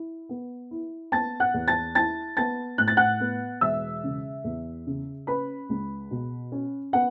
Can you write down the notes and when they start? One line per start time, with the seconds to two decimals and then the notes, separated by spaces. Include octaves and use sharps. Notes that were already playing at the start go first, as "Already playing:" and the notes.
Already playing: E4
0.29 B3
0.71 E4
1.12 B3 A5 A6
1.40 F#5 F#6
1.54 E2
1.68 A5 A6
1.95 E4 A5 A6
2.37 B3 A5 A6
2.78 A2 F#6
2.88 A6
2.97 F#5 F#6
3.20 B3
3.61 E1 E5 E6
4.03 C#3
4.44 E2
4.86 C#3
5.27 C#4 B4 B5
5.69 C#2
6.11 B2
6.52 C#4
6.93 B3 F#5